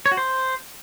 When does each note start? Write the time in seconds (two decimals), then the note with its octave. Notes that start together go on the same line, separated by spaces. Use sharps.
0.06 C#5
0.11 F#4
0.17 C5